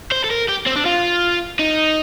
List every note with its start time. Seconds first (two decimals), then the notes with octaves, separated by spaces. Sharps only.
0.12 C5
0.24 A4
0.30 A#4
0.49 G4
0.67 C4
0.76 D4
0.86 F4
1.59 D#4